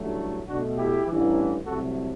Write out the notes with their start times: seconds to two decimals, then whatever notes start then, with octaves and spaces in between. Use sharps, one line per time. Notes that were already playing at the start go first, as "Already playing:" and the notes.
Already playing: A1 G2 F#3 A3
0.48 B1 B2 A3 D4 F#4
0.77 E4 G4
1.06 A1 G2 E3
1.65 C2 C3 F#3 A3 F#4 A4